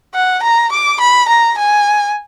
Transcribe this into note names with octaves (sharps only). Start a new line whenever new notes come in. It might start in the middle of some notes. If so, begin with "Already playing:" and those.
F#5
A#5
D6
B5
A#5
G#5